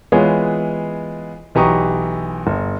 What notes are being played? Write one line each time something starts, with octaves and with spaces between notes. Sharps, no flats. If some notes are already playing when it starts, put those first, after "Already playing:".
E3 G#3 B3 F4 G#4 C#5
B1 E3 G4 A#5 C#6 D#6
G1